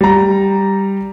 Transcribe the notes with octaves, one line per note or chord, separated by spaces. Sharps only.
G3 A#5